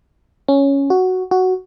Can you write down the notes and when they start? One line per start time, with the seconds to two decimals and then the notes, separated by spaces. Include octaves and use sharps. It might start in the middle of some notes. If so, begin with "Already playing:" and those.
0.48 C#4
0.90 F#4
1.31 F#4